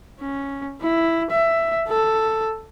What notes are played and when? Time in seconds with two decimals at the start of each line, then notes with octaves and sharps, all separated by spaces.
0.21 C#4
0.81 E4
1.31 E5
1.88 A4